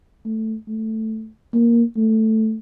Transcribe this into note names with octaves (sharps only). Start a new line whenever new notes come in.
A3
A3
A#3
A3